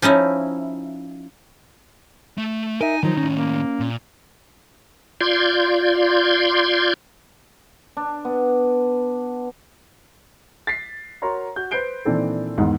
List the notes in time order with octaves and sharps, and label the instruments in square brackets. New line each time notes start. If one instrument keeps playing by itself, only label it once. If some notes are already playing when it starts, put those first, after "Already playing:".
[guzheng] F3 C#4 D#4 E4
[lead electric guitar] A3
[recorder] D#4 [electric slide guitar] A#4 E5 [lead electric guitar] G#5
[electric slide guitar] D#3 F3 C5 [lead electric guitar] F#3 [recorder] D#4
[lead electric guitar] A2 D#3 [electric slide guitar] C#4
[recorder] A#3
[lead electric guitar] A#2
[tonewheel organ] F4 D5 C6 G6 G#6
[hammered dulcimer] D4
B3
[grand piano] A6 B6 C7
F#4 A#4 C#5 A#5 C6
F#4 G6
B4 C5 G6 C7 D7 G7
A#2 D#3 E3 C4 D4 A4
E2 G#2 D#3